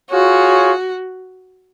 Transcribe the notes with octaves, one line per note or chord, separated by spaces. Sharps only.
F4 F#4 G#4 C#5